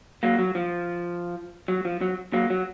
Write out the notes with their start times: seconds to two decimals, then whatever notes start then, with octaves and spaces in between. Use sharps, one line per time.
0.23 F#3 A#3
0.39 F#3
0.55 F3
1.68 F#3
1.85 F3
2.01 F#3
2.33 F#3 A#3
2.50 F#3